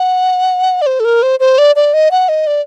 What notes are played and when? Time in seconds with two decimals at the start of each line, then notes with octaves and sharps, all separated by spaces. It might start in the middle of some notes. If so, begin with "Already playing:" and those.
Already playing: F#5
0.82 D5
0.86 C5
1.00 A4
1.05 A#4
1.23 C5
1.40 C5
1.58 D5
1.76 D5
1.94 D#5
2.11 F#5
2.29 D#5
2.47 D5